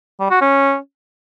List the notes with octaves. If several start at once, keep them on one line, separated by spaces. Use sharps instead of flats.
G3
F#4
C#4